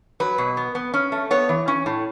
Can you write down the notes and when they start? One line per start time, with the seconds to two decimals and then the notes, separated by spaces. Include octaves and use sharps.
0.20 F#3 B4
0.38 B2
0.57 B3
0.75 B3
0.94 C#4
1.12 A3
1.31 B3 C#5
1.49 E3
1.68 C#4
1.86 A2